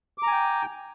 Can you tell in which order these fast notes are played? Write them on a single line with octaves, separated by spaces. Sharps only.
D6 A#5 G#5 G5